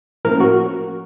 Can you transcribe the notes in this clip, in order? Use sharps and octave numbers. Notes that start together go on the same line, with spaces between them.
A2 F3 A#3 C#4 A#4
F#4